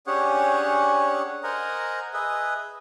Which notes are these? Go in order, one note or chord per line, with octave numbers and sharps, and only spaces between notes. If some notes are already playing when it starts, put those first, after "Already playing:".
C#4 D4 G4 G#4 C#5 F#5
A#4 C5 D#5 F#5 G#5 A#5
G#4 B4 D#5 E5